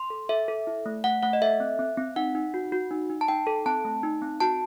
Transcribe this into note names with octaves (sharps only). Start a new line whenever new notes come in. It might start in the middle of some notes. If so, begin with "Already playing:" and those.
Already playing: C6
A4
A4 E5
A4
E4
A3
A3 F#5
A3 F#5
D#5
A4 E5
C4
C4
C4
D#4 F#5
D#4
F#4
F#4
D#4
D#4
A5
D#4 G5
A4
C4 A5
A3
D#4
C4
F#4 A5